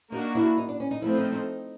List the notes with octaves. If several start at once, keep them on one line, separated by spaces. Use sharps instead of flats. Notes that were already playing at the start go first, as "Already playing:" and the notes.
A#3 D4 D#4 F#4
E4
D#4
D4
C#4
D#4
F3 A3 C4 E4
D#4
D#4